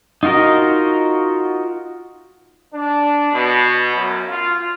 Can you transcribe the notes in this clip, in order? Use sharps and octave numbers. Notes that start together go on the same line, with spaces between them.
D#4 F4 F#4 A#4 D#5
D4
B2
F#2
F4